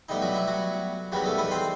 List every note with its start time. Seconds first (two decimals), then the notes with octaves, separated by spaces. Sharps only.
0.09 A2 G3 B3 D#4
0.22 F#3 F#4
0.34 E4
0.47 F#3 F#4
1.12 E2 D#3 F#3 G3 B3 F#4
1.25 A3 A4
1.38 B3 B4
1.51 C4 C5